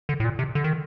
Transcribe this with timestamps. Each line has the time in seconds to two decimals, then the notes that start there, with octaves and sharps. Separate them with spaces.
0.09 D3
0.20 A2
0.24 A#2
0.39 C3
0.55 D3
0.64 D#3